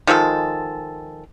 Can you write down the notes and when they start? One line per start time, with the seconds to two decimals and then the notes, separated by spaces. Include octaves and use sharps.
0.07 D#3 F3 G#3 A4